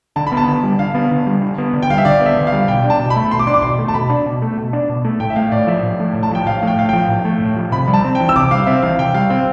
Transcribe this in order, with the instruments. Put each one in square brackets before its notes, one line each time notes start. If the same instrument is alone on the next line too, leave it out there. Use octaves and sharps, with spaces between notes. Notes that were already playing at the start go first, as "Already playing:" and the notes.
[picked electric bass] D3 [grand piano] A5
[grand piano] B5
[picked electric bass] B3
[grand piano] A5
[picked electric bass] D3
G3
[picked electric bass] D3 [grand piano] F5
[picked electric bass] B3
D3
G3
D3
B3
D3
[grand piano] G5
[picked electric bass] G3 [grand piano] F5
[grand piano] E5
[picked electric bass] D3 [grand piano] D5
[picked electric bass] B3
[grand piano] E5
[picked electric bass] D3
[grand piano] F5
[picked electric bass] G3
[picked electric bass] B2 [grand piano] G5
[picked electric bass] D4
[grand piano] A5
[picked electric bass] B2
[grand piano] B5
[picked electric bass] A3
[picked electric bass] B2 [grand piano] C6
[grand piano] D6
[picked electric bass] D4 [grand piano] C6
[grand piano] D6
[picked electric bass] B2 [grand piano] C6
[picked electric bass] A3
[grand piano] A5
[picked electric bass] B2 [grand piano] B5
[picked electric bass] D4
B2
A3
B2
D4
B2
A3
[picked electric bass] A2 [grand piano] G5
[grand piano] E5
[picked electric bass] A3 [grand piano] F5
[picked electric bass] A2 [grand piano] D5
[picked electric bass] F3 [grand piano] E5
[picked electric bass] A2
A3
A2
[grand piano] A5
[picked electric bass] F3 [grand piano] G5
[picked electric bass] A2 [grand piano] F5
[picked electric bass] A3 [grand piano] G5
[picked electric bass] A2 [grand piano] F5
[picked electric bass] F3 [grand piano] G5
[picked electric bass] A2
A3
A2
F3
[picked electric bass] C3 [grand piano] B5
[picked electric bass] G3
[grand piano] A5
[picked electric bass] C4
[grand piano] G5
[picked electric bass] E3
[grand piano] E6
[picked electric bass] C3 [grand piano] D6
[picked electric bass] G3 [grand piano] F5
[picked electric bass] C4 [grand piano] E5
[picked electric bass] E3 [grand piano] F5
[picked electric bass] C3 [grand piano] G5
[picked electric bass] G3 [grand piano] F5
[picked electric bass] C4 [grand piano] G5